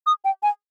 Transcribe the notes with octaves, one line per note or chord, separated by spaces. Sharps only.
D#6
G5
G#5